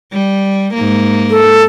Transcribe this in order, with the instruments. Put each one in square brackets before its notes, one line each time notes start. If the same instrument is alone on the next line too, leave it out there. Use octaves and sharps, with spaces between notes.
[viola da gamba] G3
G#2 A#3
[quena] A4